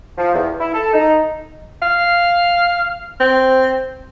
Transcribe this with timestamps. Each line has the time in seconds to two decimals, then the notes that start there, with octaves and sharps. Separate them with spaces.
0.18 F3
0.34 E2
0.60 E4
0.74 A4
0.93 D#4
1.82 F5
3.20 C4